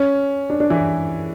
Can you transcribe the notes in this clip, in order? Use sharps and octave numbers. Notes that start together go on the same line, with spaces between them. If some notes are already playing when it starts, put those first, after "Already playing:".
Already playing: C#4
D4
D4
E3 E4